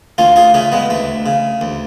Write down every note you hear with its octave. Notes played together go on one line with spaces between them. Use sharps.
D2 C#4 F4
F4 G#4
C#3 A3 C#4
G#3 B3
D2 A3
C#3
D2